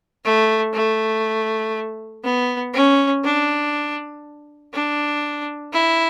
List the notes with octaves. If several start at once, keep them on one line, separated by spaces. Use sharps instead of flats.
A3
A3
B3
C#4
D4
D4
E4